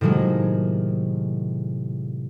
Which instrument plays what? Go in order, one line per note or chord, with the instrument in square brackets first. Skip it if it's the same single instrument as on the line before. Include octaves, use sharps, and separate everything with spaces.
[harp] A2 C3 D#3 F#3 G#3 A#3